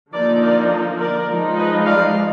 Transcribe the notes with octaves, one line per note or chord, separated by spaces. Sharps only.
D3 F3 A#3 D#4 A#4 D5
A#4 D5
A#4 D5
F3 G#3 D#4
B4 D#5
D5 F5